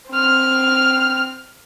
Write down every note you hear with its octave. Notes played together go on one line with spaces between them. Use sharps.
C4 F6